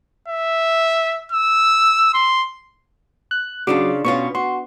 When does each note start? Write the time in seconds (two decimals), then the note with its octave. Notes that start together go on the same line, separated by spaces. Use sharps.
0.28 E5
1.32 E6
2.14 C6
3.31 F#6
3.67 C#3 F#3 D4 F4 D6
4.05 B2 C#4 F4 C#6
4.35 F#4 C6